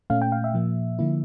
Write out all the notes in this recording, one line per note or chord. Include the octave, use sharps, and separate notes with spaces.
A#2 A3 C#4 F5
G5
F5
E5
A#2 F3 A#3
D3 F3 A#3 E4